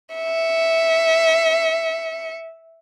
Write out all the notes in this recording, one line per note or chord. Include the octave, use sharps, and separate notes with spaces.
E5 C#7